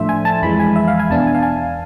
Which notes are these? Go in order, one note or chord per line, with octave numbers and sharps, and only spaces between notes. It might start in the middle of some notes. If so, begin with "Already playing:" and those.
Already playing: A2 F3 A3 D4 C5 E5
G#5
A5
F2 E3 G#3 B5
G#5
E5
F5
G#5
E2 B2 B3 D4 A5
G#5
F5
G#5